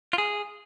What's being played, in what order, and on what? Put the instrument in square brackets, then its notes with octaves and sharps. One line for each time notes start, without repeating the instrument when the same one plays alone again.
[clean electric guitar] F4
G#4